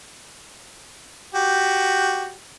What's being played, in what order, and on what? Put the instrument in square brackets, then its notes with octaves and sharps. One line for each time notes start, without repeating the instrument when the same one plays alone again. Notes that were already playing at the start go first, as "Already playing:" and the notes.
[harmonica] F#4 G4